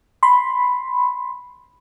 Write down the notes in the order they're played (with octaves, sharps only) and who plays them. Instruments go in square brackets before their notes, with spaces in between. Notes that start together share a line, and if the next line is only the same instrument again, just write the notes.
[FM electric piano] B5 C6